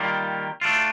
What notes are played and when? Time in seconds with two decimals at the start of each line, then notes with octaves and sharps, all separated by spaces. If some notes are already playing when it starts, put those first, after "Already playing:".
Already playing: D#3 G3 A#3 F4
0.61 A3 D4 F4